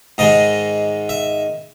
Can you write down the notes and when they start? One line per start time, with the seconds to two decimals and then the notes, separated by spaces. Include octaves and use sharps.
0.18 G#2 D#3 G#3 D#5
1.09 E5